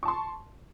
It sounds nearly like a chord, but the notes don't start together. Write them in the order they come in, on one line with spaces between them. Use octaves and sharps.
C#6 A5 C6